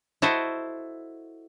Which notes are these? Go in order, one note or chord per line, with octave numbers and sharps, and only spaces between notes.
E4 F#4 A4 C5 D#5 E5